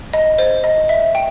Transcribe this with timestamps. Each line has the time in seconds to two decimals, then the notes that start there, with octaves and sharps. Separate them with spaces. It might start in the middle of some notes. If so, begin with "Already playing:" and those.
0.13 D#5
0.38 C5
0.64 D#5
0.89 E5
1.15 G5